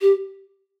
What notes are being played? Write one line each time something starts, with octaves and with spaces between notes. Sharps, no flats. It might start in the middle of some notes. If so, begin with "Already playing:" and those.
G4